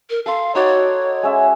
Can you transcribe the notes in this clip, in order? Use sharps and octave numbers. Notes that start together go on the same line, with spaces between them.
A#4
A4 F5 C6
D#4 F#4 C#5 D5
G#3 C#4 E5